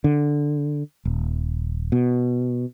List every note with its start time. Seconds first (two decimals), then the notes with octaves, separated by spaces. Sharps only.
0.04 D3
1.05 D#1
1.92 B2